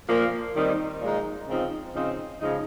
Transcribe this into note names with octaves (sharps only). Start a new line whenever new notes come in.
A#2 F3 A#3
D#3 G3 C4 D#4
A#2 F3 G#3 D#4
C#3 F3 C4 D#4
C#3 F3 C4 D#4
C#3 F3 G#3 D#4